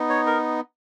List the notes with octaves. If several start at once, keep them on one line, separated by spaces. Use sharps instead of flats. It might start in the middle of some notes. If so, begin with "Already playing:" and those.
Already playing: B3 D#4
C#5
A#4